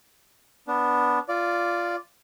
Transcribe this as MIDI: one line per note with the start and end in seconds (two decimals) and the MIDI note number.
0.68 1.19 59
0.68 1.19 62
1.29 1.96 65
1.29 1.96 74